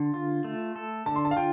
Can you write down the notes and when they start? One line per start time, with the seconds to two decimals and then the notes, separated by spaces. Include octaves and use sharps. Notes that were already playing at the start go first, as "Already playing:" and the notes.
Already playing: D3 C6
0.14 F4
0.44 A3
0.76 A4
1.06 D3 A5
1.16 C6
1.25 A5
1.31 F5
1.37 F4 G5